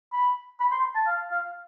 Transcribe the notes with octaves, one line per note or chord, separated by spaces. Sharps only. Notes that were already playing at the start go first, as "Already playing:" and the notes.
B5
B5
C6
A5
F5
F5